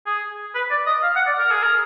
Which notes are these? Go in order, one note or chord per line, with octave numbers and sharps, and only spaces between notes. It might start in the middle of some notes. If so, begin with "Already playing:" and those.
G#4
B4
D5
D#5
F5
F#5
D5
A#4
G#4
A#4